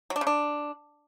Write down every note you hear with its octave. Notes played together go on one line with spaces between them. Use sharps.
F#3
D4
C#3
D4